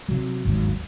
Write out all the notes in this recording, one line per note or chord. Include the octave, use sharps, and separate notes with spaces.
C3 F#3
G1 D#2 G#2 F#3